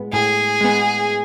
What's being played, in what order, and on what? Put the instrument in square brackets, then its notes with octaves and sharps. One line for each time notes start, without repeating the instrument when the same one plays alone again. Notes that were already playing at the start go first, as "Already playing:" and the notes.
Already playing: [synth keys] A2 G#3 B3
[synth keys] A2 [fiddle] G#4
[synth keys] G#3 B3